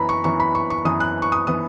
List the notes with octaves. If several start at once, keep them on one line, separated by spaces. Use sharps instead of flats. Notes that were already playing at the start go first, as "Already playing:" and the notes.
Already playing: F#2 E3 B3 A#5 B5
C#6
F#2 E3 B3 C#6
B5
C#6
C#6
F#2 E3 B3 D#6
F#6
C#6
D#6
E3 B3 D#6